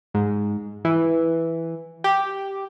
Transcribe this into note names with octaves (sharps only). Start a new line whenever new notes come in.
G#2
E3
G4